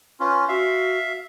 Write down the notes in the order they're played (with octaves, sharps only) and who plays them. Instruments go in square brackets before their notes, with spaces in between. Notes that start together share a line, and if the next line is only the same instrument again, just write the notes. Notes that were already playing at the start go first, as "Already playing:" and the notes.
[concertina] C#4 F4 [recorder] B4
[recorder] F#4 [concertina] E5 F5